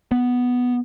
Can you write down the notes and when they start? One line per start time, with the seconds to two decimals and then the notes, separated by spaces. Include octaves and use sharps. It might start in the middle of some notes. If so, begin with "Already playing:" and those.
0.12 B3